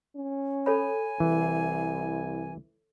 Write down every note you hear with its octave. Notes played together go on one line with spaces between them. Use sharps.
C#4
A4 C#5 G#5 B5
C2 E3